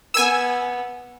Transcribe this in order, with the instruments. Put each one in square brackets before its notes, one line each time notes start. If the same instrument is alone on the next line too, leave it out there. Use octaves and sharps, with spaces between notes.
[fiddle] B3 [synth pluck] G#5 E6